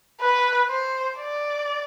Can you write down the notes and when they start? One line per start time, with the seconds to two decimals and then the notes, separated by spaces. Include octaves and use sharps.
0.21 B4
0.69 C5
1.19 D5